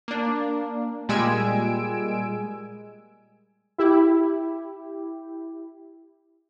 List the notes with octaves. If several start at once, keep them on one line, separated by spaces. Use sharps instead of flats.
A#3 D4
A#2 G3 G#3 G#5 E6 D7
E4 G4